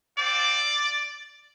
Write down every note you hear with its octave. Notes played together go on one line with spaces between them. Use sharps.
C4 F4 D5